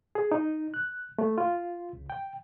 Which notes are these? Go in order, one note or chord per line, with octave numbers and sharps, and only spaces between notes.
G#4
D#4
F#6
A3
F4
C#2
G5